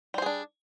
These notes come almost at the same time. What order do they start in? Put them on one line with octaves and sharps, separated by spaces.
G3 C5 G#4 D4